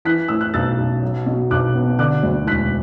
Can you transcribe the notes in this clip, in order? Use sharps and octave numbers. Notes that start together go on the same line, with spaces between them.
E3 F#6 B6
A2 E6
F#6
B1 E6 A6
B1
F#3
B2
B1 D6 F#6
B3
D3 D6 F#6
D2
E1 F#6 B6